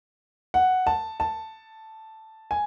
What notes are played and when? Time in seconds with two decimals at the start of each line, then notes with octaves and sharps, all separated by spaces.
0.54 F#5
0.87 A5
1.20 A5
2.51 G#5